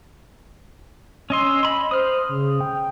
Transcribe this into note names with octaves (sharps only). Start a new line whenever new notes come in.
C#4 D#5 C6 E6
D#5 B5 C6
C5 D#6 F6
C#3
G5